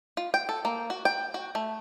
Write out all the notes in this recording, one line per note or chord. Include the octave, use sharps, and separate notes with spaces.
F4
G5
A4
A#3
F#4
G5
F#4
A3